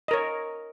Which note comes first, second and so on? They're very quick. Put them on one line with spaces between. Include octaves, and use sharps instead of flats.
D#5 A#4 C#5